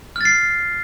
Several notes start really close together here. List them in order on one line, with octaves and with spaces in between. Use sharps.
F6 A6 C7